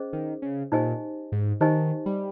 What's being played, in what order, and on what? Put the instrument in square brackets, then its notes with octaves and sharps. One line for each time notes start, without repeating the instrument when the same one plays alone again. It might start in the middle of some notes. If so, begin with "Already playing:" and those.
Already playing: [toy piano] C#4 G#4 C5 D#5
[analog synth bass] D#3
C#3
[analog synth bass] A#2 [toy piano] D#4 G4 C5 D#5 G#5
[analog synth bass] G#2
[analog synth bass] D#3 [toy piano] D#4 G4 C5 D#5 G#5
[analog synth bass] G3